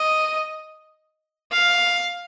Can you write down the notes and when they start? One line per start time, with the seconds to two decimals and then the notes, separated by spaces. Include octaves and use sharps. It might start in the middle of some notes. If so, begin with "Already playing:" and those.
Already playing: D#5
1.52 F5